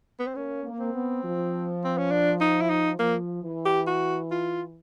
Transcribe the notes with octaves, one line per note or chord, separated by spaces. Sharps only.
B3
C4
A#3 C#4
A#3
C4
B3
F3
C4
C#4
D4
D#4
E4
D#4
F3 A#3
E3
G4
F#4
F4